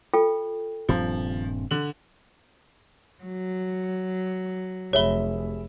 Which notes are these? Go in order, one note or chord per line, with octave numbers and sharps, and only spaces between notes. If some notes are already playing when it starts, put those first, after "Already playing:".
F4 A4 G5
D#1 G2 F3 C4
D3 F#7
F#3
F1 G#4 C#5 E5 B5 G7